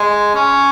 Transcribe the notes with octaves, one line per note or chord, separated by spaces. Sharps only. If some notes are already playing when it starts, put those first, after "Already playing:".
Already playing: G#3
C#4